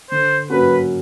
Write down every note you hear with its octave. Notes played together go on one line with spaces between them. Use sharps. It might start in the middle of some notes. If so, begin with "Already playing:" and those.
D3 C5
F#3 A#3 C#4 F#4 B4